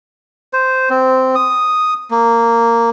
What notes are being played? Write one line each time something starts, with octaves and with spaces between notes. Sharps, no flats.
C5
C4
D#6
A#3